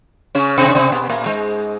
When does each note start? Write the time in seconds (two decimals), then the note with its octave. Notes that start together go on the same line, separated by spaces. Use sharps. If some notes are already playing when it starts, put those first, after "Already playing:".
0.35 C#3 C#4
0.58 C3 C4
0.68 C#4
0.75 C3 C4
0.92 B2 B3
1.10 A#2 A#3
1.26 G#2 G#3